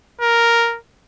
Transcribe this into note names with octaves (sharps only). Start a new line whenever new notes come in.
A#4